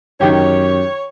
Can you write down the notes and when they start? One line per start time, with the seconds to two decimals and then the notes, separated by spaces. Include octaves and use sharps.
0.21 F#2 D#3 G4 C#5